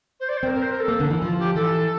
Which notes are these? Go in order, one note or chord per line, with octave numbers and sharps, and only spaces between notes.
C5
D5
C5
C4 A#4
A#4
C5
A#4
A4
A#3
D3
E3
F3 F4
G4
E3 A4